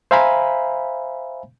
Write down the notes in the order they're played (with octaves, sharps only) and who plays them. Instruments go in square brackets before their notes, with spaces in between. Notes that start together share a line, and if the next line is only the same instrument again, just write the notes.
[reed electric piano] C5 E5 F5 G#5 A#5 B5